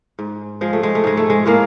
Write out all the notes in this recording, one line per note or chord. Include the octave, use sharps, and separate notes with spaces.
G#2
F3 G#3
A3
G#3
A3
G#2 G#3
A3
G#3
A2 G#3 A#3